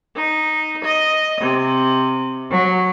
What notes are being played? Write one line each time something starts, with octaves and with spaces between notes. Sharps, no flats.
D#4
D#5
C3
F#3